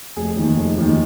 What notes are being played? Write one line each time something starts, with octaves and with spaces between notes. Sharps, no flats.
F1 G#4
D#2 D#3
F1
D#2 D#3